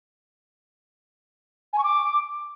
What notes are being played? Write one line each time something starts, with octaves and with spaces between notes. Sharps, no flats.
G#5
C#6
D6